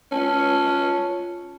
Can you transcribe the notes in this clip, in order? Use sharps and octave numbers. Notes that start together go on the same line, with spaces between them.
C#4 F4 A5